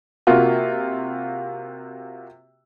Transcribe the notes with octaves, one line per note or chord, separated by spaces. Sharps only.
C3 A#3 F4 F#4